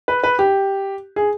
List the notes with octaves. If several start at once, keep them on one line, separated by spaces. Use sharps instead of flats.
B4
B4
G4
G#4